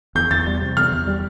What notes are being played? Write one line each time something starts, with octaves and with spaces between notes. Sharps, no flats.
E2 G6
E2 A6
G3
C3
E2 F6
E2
G3